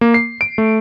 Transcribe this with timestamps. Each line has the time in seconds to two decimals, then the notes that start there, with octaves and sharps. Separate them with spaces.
0.01 A#3
0.14 C7
0.41 D7
0.58 A3